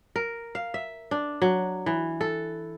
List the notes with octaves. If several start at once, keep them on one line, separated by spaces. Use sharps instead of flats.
A#4
F5
E5
D4
F#3
E3
A4